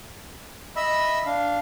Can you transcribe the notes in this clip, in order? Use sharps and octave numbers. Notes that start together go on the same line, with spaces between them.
D#5 E5 B5 E6
D4 F5